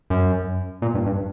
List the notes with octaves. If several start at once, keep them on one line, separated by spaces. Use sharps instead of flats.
F#2
A#2
G2
G2